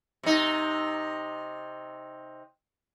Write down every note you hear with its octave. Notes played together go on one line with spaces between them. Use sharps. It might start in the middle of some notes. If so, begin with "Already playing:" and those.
C3 D#4